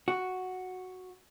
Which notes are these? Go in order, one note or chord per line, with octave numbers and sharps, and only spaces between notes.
F#4